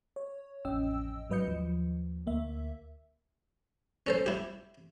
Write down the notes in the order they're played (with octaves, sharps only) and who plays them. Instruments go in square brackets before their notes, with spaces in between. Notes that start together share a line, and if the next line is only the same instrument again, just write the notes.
[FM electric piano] C#5
A1 F2 C#4 D#5 G5 E6
G#2 F#3 B4 D#5 G6 C#7
D#2 F3
D2 A#3 E5
[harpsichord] C#4 A4 C5
E4 G4